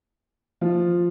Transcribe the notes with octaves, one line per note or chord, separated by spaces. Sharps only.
F3 F4